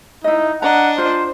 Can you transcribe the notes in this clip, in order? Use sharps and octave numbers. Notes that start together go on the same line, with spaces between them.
D#4 E4 D#5
D4 D#5 F#5 A#5
F4 C5